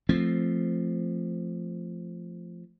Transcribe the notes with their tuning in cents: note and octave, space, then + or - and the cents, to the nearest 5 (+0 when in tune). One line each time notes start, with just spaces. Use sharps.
F3 -10 A3 +0 C4 +0